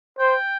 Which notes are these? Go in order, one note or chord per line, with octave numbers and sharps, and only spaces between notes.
C5 G5